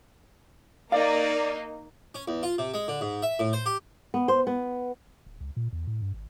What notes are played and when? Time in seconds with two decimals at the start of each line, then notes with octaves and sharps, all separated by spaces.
0.92 A#3 D#4 D5 F5
2.15 C#4
2.28 E2
2.43 F4
2.58 C3
2.74 G#3
2.88 D3
3.01 G#2
3.23 E5
3.39 A2
3.53 C5
3.66 G4
4.14 B3
4.28 C5
4.47 B3
5.26 D1
5.40 C#2
5.57 A#2
5.73 E2
5.87 A2
6.02 G2
6.14 G#1